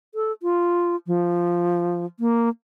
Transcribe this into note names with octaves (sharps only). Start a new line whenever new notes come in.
A4
F4
F3
A#3